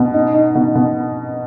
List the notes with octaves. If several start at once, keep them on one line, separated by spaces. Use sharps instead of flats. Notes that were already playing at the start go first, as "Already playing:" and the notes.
Already playing: B2
D#4
D#4
B2
B2